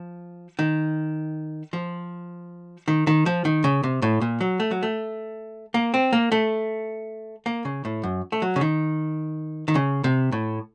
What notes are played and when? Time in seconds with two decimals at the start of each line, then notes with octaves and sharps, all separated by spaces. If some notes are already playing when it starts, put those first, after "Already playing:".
Already playing: F3
0.59 D#3
1.73 F3
2.88 D#3
3.07 D#3
3.26 F3
3.45 D#3
3.64 C#3
3.83 C3
4.02 A2
4.21 A#2
4.41 F#3
4.60 A3
4.71 F#3
4.83 A3
5.74 A#3
5.94 C4
6.13 A#3
6.32 A3
7.46 A#3
7.65 C#3
7.85 A2
8.03 F#2
8.32 A3
8.42 F#3
8.56 C#3
8.61 D#3
9.68 D#3
9.75 C#3
10.04 C3
10.32 A2